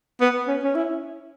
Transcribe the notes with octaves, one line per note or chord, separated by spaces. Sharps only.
B3
C#4
C#4
E4